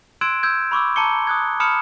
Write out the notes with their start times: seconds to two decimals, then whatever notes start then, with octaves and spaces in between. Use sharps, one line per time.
0.21 C6 E6 F#6 G#6 D7 E7
0.43 E6 G6 G#6
0.71 B5 C#6 D6 E6
0.96 A5 A#5 D6 C#7 G7
1.27 D#6 F#6 G#6
1.60 A5 B5 D#6 F6 C#7 E7